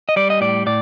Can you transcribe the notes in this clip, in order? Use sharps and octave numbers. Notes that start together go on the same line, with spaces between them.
D#5
G3 D5
D#5
A2 D5
A2 D5